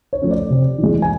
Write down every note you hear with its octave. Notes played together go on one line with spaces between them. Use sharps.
C#5
F3 A3 C#4
D5
C3
E3
G#3
G#5